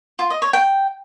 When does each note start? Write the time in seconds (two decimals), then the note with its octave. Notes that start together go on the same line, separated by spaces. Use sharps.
0.19 F4
0.30 D#5
0.42 C#5
0.53 G5